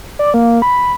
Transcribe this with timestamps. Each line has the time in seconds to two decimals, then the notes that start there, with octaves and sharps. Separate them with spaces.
0.19 D5
0.34 A#3
0.62 B5